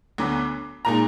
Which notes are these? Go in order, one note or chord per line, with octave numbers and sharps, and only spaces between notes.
D2 D3 F#3 B3 D6
A#2 G#3 D#4 A#5